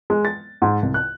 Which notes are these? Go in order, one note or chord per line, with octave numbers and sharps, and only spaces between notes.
G#3
A6
G#2
C2
F#6